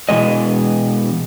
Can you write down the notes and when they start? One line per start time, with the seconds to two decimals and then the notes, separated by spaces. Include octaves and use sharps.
0.09 B2 E3 G#3 D#5